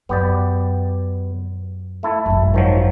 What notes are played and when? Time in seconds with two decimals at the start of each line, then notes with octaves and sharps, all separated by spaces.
0.09 F#2 B3 G4 D5
2.03 A3 E4 A4
2.26 G#1 F#2
2.54 D#3 F3 F#3